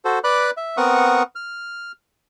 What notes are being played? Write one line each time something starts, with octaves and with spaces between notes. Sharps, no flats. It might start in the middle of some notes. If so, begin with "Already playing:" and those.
F#4 A4 C5
B4 D5 B5 D6 F#6
E5
B3 C4 A#4 F#5 C#6 D#6
F6